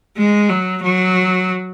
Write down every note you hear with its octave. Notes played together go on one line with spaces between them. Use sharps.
G#3
F#3
F#3